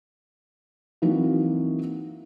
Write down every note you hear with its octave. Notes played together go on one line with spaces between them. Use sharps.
E3 F#3 A#3 C4 D#4 F#4